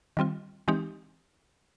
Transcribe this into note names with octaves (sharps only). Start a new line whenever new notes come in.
D#3 G3 C4 F4
E3 G#3 C4 D#4 G4